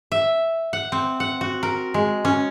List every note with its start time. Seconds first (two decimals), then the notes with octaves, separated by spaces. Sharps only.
0.12 E5
0.73 F#5
0.92 C4
1.20 F#5
1.41 F#4
1.63 A#4
1.94 G#3
2.25 C#4